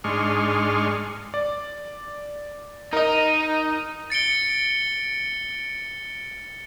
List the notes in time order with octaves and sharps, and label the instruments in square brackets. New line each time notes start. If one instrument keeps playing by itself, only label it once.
[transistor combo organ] G#2 G#3 D4 C6 C#6 F6
[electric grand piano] D5
[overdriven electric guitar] D#4 [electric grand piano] A#4 D#5
[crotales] A6 C#7 D7 G7